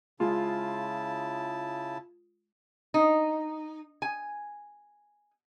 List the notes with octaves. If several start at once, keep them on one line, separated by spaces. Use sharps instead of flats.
C#3 G#3 E4 F4 A5
D#4
G#5